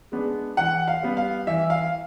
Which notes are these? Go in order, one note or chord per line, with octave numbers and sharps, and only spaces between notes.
G#3 B3 D4
E3 F#5
F5
G3 B3
F5
E3 E5
F5